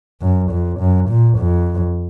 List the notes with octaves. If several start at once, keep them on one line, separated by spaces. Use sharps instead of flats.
F#2
F2
F#2
A#2
F2